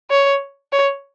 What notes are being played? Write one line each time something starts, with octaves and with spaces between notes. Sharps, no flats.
C#5
C#5